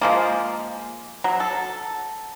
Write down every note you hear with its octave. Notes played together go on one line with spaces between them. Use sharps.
F3 G#3 A#3
F#3
A4